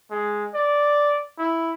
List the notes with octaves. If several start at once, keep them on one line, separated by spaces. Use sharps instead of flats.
G#3
D5
E4